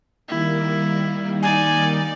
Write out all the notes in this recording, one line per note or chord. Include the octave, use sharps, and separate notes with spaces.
D#3 G3 A#3 E4
D#4 D5 G#5